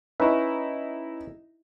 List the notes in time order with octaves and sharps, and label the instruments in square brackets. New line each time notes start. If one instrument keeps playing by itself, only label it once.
[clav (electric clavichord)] C#4 B4 E5 [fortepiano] D#4 E4